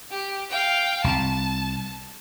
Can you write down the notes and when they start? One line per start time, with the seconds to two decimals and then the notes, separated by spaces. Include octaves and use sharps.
0.11 G4
0.50 F5 G5
1.04 C2 A5